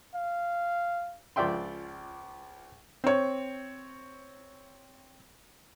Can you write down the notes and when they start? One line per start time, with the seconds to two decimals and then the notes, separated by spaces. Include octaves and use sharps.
0.15 F5
1.36 C#2 F3 D5 E5 G5 C6
3.04 C4 C#5